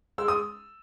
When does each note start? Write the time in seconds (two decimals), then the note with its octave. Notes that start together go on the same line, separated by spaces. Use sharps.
0.18 G#3 E6
0.28 D#6